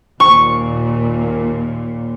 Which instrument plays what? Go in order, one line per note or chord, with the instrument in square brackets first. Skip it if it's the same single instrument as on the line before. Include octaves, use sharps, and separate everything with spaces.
[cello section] D#2 A#2 [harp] C#6